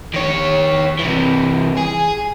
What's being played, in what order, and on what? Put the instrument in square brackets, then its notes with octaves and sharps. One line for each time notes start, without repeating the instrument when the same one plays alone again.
[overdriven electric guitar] D#3 C#5
C3 E3
G#4